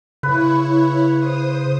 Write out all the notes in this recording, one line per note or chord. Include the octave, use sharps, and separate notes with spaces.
C#3 E4 B4 C#5
C5 D#6